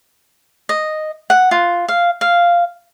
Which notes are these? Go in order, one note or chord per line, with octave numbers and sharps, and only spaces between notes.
D#5
F#5
F4
F5
F5